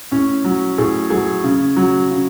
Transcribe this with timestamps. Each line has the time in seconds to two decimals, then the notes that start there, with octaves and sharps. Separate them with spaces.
0.11 A2 C#4
0.45 F#3
0.78 A2 G#4
1.10 F#3 G#4
1.44 C#3
1.76 F#3
2.11 C#3